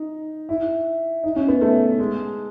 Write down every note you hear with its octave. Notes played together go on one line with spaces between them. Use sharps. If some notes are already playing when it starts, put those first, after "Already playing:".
Already playing: D#4
E4
D#4
C#4
B3
A3
G#3